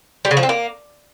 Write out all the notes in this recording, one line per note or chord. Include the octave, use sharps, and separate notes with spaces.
G3
C#3
F3
C4
A#3